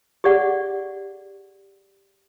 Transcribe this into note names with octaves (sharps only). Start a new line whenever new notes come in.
G4 G#4 D5 F#5